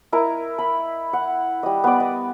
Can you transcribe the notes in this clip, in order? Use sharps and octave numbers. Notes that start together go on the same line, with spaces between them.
E4 A#4 D#5 A#5
B5
F#5
G3 D#5
B3 D5
D#5